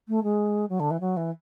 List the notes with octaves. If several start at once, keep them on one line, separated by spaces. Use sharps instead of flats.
A3
G#3
F#3
D3
E3
F#3
E3